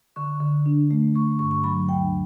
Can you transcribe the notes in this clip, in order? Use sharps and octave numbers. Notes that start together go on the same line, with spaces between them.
D3 C#6
D3
D4
A3
A3 C#6
G2 C#6
C#6
F#3 B5
D2 G5